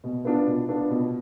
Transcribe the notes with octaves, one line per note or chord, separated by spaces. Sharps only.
B2
B3 D4 F4
B2
B3 D4 F4
B2